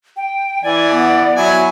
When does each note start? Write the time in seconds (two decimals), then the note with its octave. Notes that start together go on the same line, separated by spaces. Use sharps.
0.17 G5
0.64 E3 D5 G#5
0.94 B3
1.36 F#3 E4 G#5